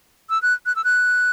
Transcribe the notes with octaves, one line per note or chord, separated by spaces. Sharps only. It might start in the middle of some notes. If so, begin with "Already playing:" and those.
E6
F#6
F#6
E6
F#6